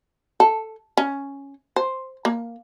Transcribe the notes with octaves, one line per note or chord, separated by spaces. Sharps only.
A4
C#4
C5
A#3